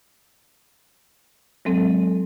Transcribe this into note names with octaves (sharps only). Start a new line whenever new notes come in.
F#3 G#3 C4 A4